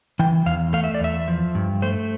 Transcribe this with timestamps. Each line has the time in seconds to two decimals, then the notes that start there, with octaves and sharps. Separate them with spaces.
0.19 E3 G5
0.46 E2 F5
0.73 A3 F5
0.84 E5
0.94 D5
1.00 E2 E5
1.28 F3
1.55 G2
1.82 A3 C5